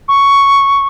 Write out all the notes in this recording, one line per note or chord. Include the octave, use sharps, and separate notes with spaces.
C#6